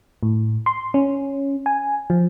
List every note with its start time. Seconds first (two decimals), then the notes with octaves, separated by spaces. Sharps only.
0.23 A2
0.66 C6
0.94 C#4
1.66 G#5
2.10 F3